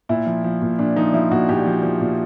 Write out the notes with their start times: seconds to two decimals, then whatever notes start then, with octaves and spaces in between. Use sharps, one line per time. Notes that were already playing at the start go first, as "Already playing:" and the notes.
0.09 A#2 E4
0.26 F3
0.44 F3
0.62 A#2
0.79 A#2 D4
0.96 F3 D#4
1.13 F3 E4
1.31 A#2 F#4
1.49 A#2 G4
1.66 F3
1.83 F3
2.01 A#2